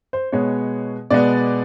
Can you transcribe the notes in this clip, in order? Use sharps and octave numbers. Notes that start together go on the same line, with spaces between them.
C5
B2 G#3 B3 C#5
B2 G#3 B3 D5